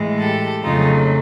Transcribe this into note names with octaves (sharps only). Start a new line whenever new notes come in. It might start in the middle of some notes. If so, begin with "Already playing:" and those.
Already playing: A2 E3 G#3
G4 A4
F2 C#3 F#3 A3 D#4 F4